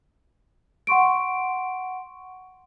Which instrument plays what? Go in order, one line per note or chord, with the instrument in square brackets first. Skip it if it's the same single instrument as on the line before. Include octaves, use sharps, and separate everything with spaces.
[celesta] F#5 C6 C#6 D7